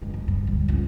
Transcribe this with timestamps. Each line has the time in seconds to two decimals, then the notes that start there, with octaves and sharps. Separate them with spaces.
0.02 G2 G#3
0.14 D1
0.28 G2
0.47 D2 G3
0.68 C#2 G#2